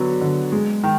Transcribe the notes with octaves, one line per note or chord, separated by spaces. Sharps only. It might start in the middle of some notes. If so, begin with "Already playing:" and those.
Already playing: D3 F#3 B3
D3
G#3
D#3